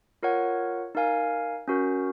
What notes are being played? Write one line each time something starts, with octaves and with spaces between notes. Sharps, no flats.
F4 A#4 C#5 F#5
D#4 A#4 F5 G#5
C#4 F#4 A#4